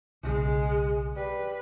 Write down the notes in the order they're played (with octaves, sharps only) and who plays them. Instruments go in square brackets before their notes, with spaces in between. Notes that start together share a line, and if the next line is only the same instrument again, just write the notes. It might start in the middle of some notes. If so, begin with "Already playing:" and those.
[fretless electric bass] B1 C#3 [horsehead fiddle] G#3
[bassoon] G3 [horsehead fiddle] B4